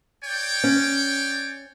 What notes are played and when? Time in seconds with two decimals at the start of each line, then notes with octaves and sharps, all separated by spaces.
0.24 C#5 D5 G5
0.64 C#4